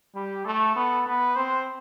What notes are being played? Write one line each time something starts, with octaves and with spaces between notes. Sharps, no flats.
G3 G4
A3 A4
B3
B3 B4
C4 C5